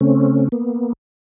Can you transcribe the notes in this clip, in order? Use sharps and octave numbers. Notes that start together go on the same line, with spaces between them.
C#3 A3 C4 C#4
A#3 B3